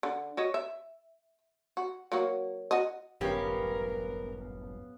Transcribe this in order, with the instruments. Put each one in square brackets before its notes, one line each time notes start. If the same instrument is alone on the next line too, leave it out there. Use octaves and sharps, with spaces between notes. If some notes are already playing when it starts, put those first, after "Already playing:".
[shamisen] D3
F#4 C#5 D#5
E5
F#4
F#3 A#3 F#4
F#4 D#5
[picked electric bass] D1 G1 F#2 [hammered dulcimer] B3 F5 [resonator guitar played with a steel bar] C#4 G4 [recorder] A#4